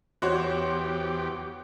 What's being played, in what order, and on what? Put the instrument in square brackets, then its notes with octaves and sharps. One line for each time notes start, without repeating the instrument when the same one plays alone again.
[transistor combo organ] E2 G4 [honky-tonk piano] F#4 C5 C#5